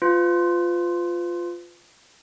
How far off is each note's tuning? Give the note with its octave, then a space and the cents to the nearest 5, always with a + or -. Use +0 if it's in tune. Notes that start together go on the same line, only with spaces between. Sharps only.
F4 +0 B4 +40